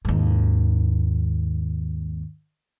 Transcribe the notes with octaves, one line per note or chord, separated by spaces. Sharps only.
D#2 G#2